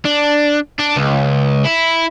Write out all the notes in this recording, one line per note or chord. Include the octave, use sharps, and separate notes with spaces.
D4
D4
C#2
E4